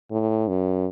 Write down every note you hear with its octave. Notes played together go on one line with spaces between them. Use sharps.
A2
F#2